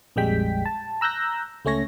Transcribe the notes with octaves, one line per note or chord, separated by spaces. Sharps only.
A#1 F2 G3 G#3 G5 B6
A5
A#5 E6 F#6 G6 A#6
C#2 A3 C#4 C#5 A#6